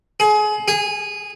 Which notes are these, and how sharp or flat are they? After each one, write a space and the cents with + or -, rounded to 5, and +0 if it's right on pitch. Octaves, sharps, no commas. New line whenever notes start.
G#4 +30
G#4 -15